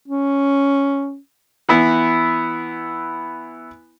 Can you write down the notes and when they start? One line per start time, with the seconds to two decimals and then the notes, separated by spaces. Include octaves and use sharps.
0.08 C#4
1.69 E3 B3 E4